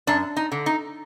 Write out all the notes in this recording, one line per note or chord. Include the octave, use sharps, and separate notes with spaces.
F#2 D4
D#4
D3
D#4